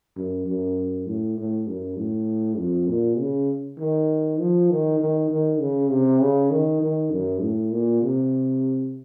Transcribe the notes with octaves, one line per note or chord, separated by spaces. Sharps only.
F#2
F#2
A2
A2
F#2
A2
F2
A#2
C#3
D#3
F3
D#3
D#3
D#3
C#3
C3
C#3
D#3
D#3
F#2
A2
A#2
C3